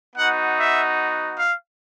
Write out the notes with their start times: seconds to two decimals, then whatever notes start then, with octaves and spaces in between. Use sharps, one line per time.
0.15 B3 D#4 F#4 F#5
0.57 E5
1.38 F5